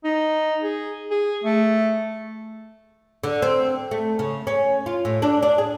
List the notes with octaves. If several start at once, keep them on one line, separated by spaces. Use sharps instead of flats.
D#4
G#4
G#4
A3
D3
C4
A3
C#3
C#4
F4
A2
D4
D4
G#4